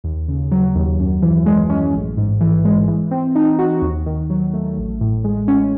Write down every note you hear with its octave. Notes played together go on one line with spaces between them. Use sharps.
D#2
C#3
F#3
D#2
F#2
E3
G#3
C#4
A1
G#2
E3
G#3
E3
C4
D#4
F#4
D#2
D#3
F#3
A3
A1
A2
G#3
C#4